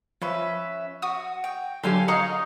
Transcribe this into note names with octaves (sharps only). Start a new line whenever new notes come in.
F3 C#4 B4 E5
F#4 D#6
G5
D3 F#3 G4 A4 F5 G#5 C6
D#4 C#5 D#5 F5 F#5 C#6